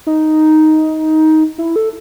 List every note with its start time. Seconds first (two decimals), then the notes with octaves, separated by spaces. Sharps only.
0.07 D#4
1.58 E4
1.76 A4